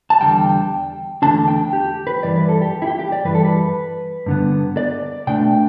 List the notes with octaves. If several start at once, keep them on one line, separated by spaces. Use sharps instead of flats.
A5
E2 D3 G3 G5
E2 D3 A3 D4 A5
G5
G4
B4
G2 E3 G3 D5
B4
A4
G4
E4
G4
G4
D5
G2 E3 G3 B4
A4
B4
G2 D3 B3
D5
B2 A3 D4 G5